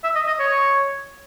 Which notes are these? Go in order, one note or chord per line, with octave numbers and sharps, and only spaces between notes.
E5
D#5
D#5
C#5